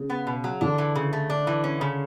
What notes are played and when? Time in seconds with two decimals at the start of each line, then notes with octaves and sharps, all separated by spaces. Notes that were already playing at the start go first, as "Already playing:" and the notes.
Already playing: C#3
0.10 B3
0.27 B2
0.44 F#3
0.61 D3 D4
0.78 E3
0.95 C#3
1.13 A3
1.30 D4
1.47 E3
1.64 C#4
1.81 C#3